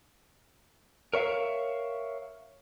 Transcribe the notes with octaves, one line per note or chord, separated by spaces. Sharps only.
A#4 C#5 E5 F5